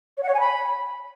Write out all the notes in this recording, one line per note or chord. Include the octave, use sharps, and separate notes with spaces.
C#5
F#5
C#5
G#5
B5